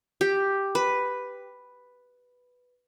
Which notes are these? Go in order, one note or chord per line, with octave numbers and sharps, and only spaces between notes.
G4
B4